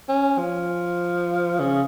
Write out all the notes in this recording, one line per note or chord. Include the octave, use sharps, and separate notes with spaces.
C#4
F3
C#3